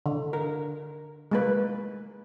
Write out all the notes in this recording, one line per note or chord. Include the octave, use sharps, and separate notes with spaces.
D3
A#4
G#3 A#3 B4